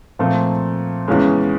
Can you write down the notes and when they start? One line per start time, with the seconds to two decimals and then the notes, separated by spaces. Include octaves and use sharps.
0.19 A#2 F3 A3 C4
1.08 E2 C#3 E3 G#3 C#4